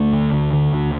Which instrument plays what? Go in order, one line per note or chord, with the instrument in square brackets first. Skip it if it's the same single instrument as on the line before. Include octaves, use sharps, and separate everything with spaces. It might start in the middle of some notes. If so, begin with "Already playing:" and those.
Already playing: [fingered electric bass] D2 A3
D3
D2
D3
D2